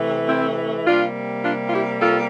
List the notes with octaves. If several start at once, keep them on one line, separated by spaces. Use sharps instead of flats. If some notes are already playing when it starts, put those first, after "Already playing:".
Already playing: C3 E3 A3
C4 E4
C3 G3 A#3 D4 F4
D4 F4
F4
E4 G4
F4 A4